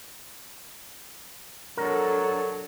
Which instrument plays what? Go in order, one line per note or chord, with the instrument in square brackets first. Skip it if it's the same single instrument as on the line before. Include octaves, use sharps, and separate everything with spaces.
[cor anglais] F#3 [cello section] D4 A4 [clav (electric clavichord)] A#4